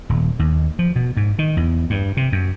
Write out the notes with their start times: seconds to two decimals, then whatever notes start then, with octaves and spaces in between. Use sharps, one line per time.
0.09 D#1
0.39 D#2
0.79 F3
0.96 B2
1.17 G#2
1.39 D#3
1.57 E2
1.90 G2
2.17 C3
2.32 F#2